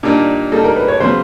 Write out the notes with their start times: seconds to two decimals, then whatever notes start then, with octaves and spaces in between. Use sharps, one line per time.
0.03 A#2 G3 A#3 D4 D#4
0.52 A#2 G3 A#3 D#4 A4
0.64 A#4
0.76 B4
0.88 C#5
1.00 C#3 F#3 B3 C5